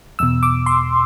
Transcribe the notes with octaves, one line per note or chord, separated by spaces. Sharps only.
E2 B2 E6
D6
C6